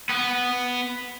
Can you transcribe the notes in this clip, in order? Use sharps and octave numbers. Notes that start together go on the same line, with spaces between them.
B3 F#5